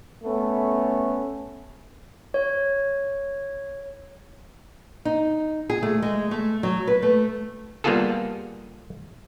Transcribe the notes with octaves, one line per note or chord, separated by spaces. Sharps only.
A3 B3 C#4
C#5
D#4
G#4
A3
G#3
A3
F#3
B4
A3
G3 A#3 B3 F4 G#4 A4